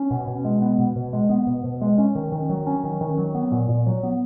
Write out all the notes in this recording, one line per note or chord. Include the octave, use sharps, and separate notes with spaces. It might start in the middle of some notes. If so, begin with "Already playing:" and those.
Already playing: C#4
B2
B2
G#3
B3
B2
B2
G#3
B3
B2
B2
G#3
C#4
D#3
D#3
F#3
C#4
D#3
D#3
F#3
B3
A#2
A#2
F#3
B3